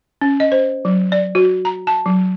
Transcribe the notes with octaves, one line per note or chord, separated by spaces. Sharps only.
C#4
D#5
C5
F#3
D5
F#4
A#5
A5
F#3